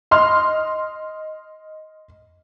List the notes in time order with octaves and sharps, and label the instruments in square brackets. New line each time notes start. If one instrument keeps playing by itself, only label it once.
[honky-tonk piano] D#5 C6 F6